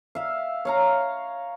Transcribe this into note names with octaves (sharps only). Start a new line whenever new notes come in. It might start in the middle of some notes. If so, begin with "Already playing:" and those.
E5 F5
C#5 F5 A#5